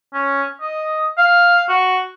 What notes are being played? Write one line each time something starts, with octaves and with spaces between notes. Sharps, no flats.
C#4
D#5
F5
F#4